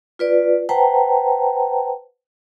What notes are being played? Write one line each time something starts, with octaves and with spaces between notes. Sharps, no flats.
F4 B4 D5
B4 C5 F#5 G5 A5 A#5